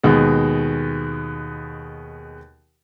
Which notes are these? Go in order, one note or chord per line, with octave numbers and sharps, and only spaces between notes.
D#2 B2 G#3